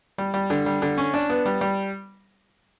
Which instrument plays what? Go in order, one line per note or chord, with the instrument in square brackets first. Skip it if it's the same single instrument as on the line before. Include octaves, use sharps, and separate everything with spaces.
[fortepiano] G3
G3
D3
G3
D3
C#4
D4
B3
G3
G3